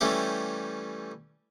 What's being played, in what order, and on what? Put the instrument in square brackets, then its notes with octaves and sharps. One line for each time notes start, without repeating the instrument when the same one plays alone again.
[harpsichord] E3 G3 A3 C#4 G4